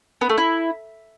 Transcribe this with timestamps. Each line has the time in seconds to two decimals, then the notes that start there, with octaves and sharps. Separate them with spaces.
0.21 B3
0.29 A3
0.38 E4